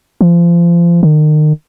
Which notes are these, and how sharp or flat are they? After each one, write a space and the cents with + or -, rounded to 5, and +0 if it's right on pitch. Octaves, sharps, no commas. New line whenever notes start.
F3 -30
D#3 -35